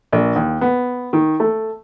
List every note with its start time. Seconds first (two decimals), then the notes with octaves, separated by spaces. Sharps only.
0.13 A#1
0.36 D#2
0.61 B3
1.13 D#3
1.40 A3